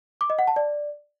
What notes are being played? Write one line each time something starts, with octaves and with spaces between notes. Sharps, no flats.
D6
D#5
F#5
A5
D5